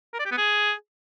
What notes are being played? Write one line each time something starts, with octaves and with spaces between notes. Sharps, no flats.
A#4
D5
G4
B3
G#4